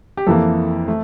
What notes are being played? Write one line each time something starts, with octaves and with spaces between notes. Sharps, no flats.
G4
F2 E3 A#3 A4
A3